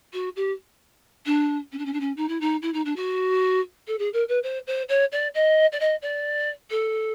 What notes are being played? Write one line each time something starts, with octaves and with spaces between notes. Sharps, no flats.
F#4
G4
D4
C#4
D4
C#4
D4
C#4
D#4
E4
D#4
E4
D#4
D4
F#4
A4
G#4
A#4
B4
C5
C5
C#5
D5
D#5
D5
D#5
D5
A4